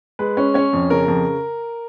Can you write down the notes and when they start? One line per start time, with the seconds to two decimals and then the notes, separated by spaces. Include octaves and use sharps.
0.19 G#3 B4
0.37 C#4
0.54 C#4 C#5
0.73 F2
0.90 C#3 A#4
1.08 F2